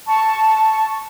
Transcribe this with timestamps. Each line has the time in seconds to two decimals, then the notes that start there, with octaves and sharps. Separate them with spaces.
0.07 A5 C#6